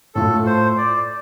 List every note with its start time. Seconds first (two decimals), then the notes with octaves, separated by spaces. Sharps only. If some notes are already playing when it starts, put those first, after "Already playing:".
0.15 A2 A3 F4 A4
0.46 C5
0.77 D5